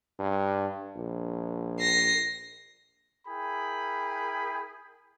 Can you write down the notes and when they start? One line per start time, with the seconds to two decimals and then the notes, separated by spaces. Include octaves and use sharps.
0.19 G2
0.96 A#1
1.81 A#6 C7
3.27 E4 G#4 A#4 G5 B5